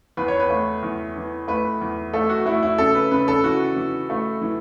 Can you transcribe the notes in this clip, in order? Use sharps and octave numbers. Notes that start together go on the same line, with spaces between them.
E2 B4
C#5
B4
A3
E2
E3
A3 B4
E2
A3 A4
F#4
A3 E4
E4
C#3 A4
B4
C#3 B4
A4
E3 F#4
E3
A3
E3